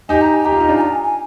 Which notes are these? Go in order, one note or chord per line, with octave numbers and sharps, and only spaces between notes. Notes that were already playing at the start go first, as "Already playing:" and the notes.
D#4 G4 G#5
A#5
G#5
G4 A#5
F4
D#4
D4 F4
G#5
A#5
G#5
G#5